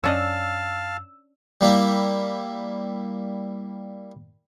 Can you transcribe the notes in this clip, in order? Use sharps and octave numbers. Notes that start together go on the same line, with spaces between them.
F#2 C#4 D4 D#5 F5 A5 E6
G3 A#3 E4